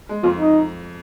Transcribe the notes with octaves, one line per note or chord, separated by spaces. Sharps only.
G#3
F2 F4
D#4